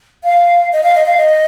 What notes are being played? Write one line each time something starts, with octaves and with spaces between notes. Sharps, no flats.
F5
D#5
F5
D#5
F5
D#5